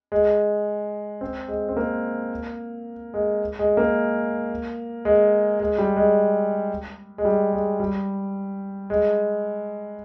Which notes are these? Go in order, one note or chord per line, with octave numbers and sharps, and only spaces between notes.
G#3
C4
G#3
C4
A#3
G#3
G#3
A#3
G#3
G#3
G3
G#3
G#3
G3
G#3
G3
G#3